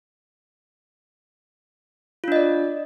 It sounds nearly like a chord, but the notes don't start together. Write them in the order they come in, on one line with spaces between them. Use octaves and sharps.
F4 D4 D#5 D5